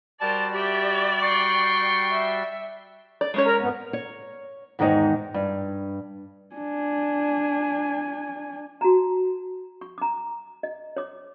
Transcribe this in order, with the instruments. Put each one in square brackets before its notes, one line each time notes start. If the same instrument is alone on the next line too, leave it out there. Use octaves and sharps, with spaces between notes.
[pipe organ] G3 F#4 A6 [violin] A#4 C5 [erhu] D5 [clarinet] A5
[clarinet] G4 [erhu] D5 [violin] E5 G5
[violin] G5 C7 [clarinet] C#6
[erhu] E5
[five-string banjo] D5
G#3 C#4 C#5
[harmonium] A#4 A#5
F2 G#2 B3
[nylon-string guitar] C#5
E2 G#2 D#3 D#4 C#5
G2
[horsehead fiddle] D4 G#5
[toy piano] F#4 A5 A#5
C#6
A#5 D6
D#5
C#5 D6